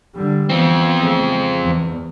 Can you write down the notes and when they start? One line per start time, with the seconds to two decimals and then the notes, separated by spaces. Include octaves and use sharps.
0.15 D3 G3
0.50 E3 F3 B3 C4
1.00 C#3 A3
1.29 G#3
1.62 E2